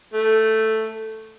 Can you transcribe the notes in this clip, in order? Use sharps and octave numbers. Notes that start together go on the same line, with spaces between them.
A3